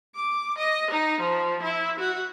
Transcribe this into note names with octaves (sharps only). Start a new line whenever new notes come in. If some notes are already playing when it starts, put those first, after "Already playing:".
D6
D#5
D#4
F3
E4
F#4